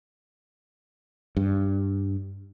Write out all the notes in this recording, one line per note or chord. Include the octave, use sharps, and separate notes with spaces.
G2